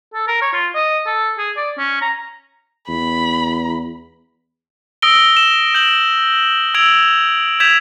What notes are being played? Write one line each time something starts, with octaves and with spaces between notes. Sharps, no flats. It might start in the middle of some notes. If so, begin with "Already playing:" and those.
A4
A#4
C#5
F4
D#5
A4
G#4
D5
C#4
A#5
E2 B5
D#6 E6 A#6 D7 G7
E7
G6 D7 F#7
E6 G#6 D7 F7 F#7
G6 G#6 B6 E7 F7